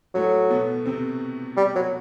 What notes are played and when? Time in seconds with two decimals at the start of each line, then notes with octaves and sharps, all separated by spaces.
0.14 A2 F#3 A3
0.50 B2 B3
0.86 C3 C4
1.57 G3
1.75 F#3